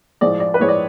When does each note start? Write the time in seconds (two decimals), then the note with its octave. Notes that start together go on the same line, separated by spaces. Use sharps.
0.21 A2 F3 G#3 D5
0.40 D5
0.54 B4
0.59 A2 F3 G#3 C#5
0.68 D5